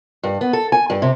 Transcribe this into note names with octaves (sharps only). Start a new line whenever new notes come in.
G2
B3
A4
G#5
G2
C3